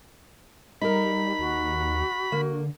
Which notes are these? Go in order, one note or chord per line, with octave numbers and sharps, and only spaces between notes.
G3 D#4 A#4 B5
D#2 F#4
D3 A#3